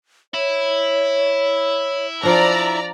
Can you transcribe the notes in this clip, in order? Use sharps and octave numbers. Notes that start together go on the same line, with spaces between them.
E4 C#5
F3 D4 D5 A#5